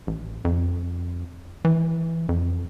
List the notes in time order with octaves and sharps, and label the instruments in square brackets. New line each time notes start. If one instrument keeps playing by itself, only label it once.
[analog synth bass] A1
F2
E3
F2